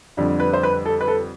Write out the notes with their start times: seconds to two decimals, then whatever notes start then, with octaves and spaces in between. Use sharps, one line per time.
0.17 F2 D3 G3
0.40 B4
0.53 C5
0.63 B4
0.86 A4
1.01 B4
1.08 A4